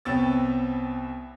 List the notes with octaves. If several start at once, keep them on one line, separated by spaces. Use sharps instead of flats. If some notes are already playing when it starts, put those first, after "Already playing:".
C2 B3 C4 C#5 E6 A6